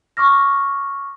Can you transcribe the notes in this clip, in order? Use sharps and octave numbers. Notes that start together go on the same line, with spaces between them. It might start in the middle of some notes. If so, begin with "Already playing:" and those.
C#6 D6 F6 A#6